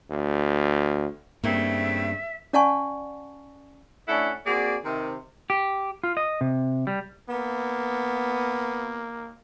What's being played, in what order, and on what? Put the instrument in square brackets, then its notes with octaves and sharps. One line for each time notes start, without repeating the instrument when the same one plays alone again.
[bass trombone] D2
[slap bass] G2 [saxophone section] C#3 A3 C4 [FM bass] A#3 [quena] E5
[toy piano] C#4 D5 F#5 G#5 A5 C#6
[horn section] A3 C#4 D4 E4 A4 F#5
A#3 C4 F#4 G#4 D5
C3 D#3
[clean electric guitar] G4
F4
D#5
C3
G3
[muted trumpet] A#3 [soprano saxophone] B3